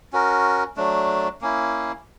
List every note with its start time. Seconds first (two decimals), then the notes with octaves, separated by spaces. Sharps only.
0.13 C#4 F#4 A#4
0.76 F#3 A3 D4
1.41 A#3 C#4 E4